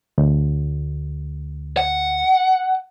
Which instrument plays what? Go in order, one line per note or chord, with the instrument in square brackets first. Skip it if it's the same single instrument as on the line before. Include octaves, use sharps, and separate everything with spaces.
[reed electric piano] D2
[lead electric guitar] F#5